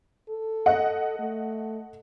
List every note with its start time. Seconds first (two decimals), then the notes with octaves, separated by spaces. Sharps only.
0.29 A4
0.66 D#5 F#5
1.19 A3